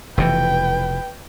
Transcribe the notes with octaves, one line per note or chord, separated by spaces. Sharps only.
F1 B2 E3 B4 G5